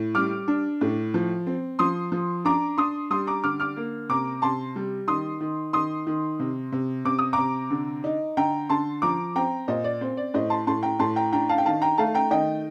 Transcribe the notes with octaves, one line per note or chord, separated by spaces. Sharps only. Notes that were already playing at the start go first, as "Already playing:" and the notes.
Already playing: A2
G3 D6 F6
D4
A2
F3
C4
F3 C6 D#6
F3
D4 A#5 D6
D4 C6 D#6
G3 C6 D#6
A#5 D6
D3 D6 F6
D6 F6
A#3
C3 A#5 D6
C3 A5 C6
G3
D#3 C6 D#6
D#3
D#3 C6 D#6
D#3
C3
C3
C3 D6
D#6
C3 A#5 D6
D3
D#4
D3 G5 A#5
D3 A5 C6
F3 A#5 D6
C4 G5 A#5
A#2 C5 D#5
D5
C4 C5
D5
A2 C5 D#5
A5 C6
A2 A5 C6
G5 A#5
A2 A5 C6
G5 A#5
D4 G5 A#5
F5 A5
G5
D#3 F5 A5
G5 A#5
A3 F5 A5
G5 A#5
D#3 D#5 G5